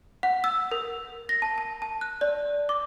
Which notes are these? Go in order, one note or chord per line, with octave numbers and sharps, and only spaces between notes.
F#5
E6
A#4
A#6
A5
A5
A5
F#6
D5
D6